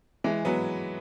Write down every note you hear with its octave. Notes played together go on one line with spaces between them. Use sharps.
E3 G#3
F#3 B3